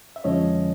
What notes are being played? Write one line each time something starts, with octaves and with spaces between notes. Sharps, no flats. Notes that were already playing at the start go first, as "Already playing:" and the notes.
E5
F2 D3 F3 G#3 C#4 C#5 D#5